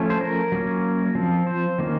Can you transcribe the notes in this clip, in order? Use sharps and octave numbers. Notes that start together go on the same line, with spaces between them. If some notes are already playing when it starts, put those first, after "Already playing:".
Already playing: F3 A3 C#4
C5
A#4
F#3 A#3 C#4
F3 C4
C5
D#3 A#3 C#4